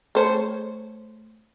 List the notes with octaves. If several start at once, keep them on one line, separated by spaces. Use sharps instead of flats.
A3 C5 C#5